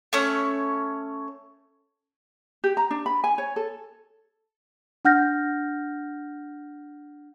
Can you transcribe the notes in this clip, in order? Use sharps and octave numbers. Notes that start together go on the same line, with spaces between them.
A3 C#4 C#5
G4
A#5
D4
B5
G#5
C#5
A4
D4 F#5 F6 G6 A#6